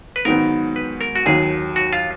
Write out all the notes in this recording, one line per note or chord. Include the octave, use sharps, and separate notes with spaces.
B4
G#2 D#3 F#3 B3 F#4 A#4
B4
A#4
F#4
D#2 D#3 F#3 G#4
F#4
F4